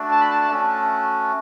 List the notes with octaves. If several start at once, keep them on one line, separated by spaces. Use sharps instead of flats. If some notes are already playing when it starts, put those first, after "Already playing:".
Already playing: A3 D4 F#4
A5
B5
A5
A5
A3 C#4 F#4